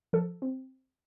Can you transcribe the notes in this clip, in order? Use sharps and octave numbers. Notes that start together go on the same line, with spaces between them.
F3 A4
C4